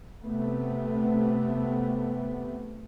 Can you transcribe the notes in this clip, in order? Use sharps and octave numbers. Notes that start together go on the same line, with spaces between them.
C3 A3 B3